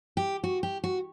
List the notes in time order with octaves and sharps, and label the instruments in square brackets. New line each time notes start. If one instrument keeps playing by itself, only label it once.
[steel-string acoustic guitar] G4
F#4
G4
F#4